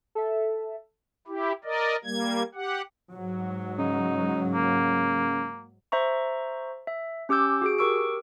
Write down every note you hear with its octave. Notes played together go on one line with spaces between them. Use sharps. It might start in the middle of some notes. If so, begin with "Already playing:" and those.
A4 E5
E4 G4
A#4 D5 D#5
G3 A#3 G#6
G4 F#5
G#2 F#3
C#3 D#4
A#3
C5 E5 A#5 C#6
E5
C#4 G4 D6 E6 G6
F#4 G#4 D7
G4 A#4 C#6 E6 D7